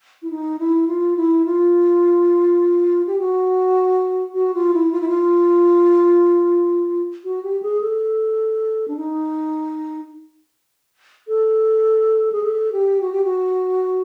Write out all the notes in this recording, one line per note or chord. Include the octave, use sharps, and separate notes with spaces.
E4
D#4
E4
F4
E4
F4
G4
F#4
F#4
F4
E4
F4
E4
F4
F#4
G4
G#4
A4
D4
D#4
A4
G#4
A4
G4
F#4
G4
F#4